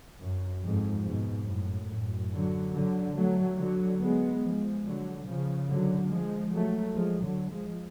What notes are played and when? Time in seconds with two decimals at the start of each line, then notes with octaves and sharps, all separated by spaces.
0.21 F#2
0.63 F2 G#2
1.05 G#2 B2
1.46 F#2 A2
1.89 F#2 A2
2.31 D3 F#3
2.73 D3 F#3
3.15 F#3 A3
3.58 D3 F#3
4.01 G#3 B3
4.43 F3 G#3
4.85 D3 F#3
5.26 C#3 F3
5.69 D3 F#3
6.11 F3 G#3
6.53 F#3 A3
6.95 F3 G#3
7.24 D3 F#3
7.52 F3 G#3